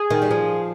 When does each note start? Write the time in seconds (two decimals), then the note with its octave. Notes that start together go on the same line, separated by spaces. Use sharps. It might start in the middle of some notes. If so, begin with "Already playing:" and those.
Already playing: G#4
0.11 D#3
0.22 G3
0.31 F3